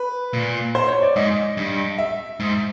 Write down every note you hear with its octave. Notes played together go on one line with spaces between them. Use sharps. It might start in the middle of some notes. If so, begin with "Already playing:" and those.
Already playing: B4
A#2
C5
C#5
D5
G#2 D#5
G2
E5
G#2